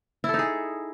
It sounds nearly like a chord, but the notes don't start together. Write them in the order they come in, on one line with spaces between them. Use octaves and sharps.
E4 A4 D#4 G#4